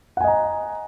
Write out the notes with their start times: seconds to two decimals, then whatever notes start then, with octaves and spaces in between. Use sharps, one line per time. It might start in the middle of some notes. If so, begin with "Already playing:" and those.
0.17 F#5
0.21 G#5
0.24 D#5
0.28 A#5